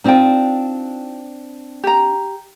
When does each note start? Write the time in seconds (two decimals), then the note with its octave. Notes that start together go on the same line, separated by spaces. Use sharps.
0.04 C4 D4 D#4 F4 G5
1.84 G4 A#5